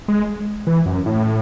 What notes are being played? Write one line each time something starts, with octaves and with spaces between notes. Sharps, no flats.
G#3
E3
F#2
A2